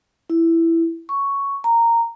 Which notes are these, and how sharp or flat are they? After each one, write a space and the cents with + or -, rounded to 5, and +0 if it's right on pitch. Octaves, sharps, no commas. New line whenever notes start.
E4 +5
C#6 +5
A#5 -10